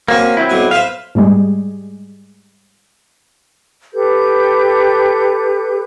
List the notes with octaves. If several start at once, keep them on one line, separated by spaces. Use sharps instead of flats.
F#3 A#3 C4 C#4
F#3 C4 E4
B1 B2 G#5
B4 C5 E5 F5
G#2 G3 G#3
G4 A4 B4 G6